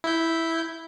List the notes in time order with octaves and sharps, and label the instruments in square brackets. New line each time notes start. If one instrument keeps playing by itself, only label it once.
[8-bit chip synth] E4 G6